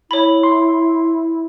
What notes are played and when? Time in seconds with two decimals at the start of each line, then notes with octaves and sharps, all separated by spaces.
0.11 E4 C#5 B5
0.43 C6